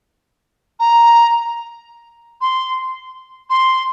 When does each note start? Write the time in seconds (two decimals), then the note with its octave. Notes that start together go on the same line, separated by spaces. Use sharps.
0.80 A#5
2.41 C6
3.50 C6